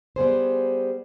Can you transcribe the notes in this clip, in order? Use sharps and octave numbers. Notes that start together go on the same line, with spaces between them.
G3 B3 G#4 C5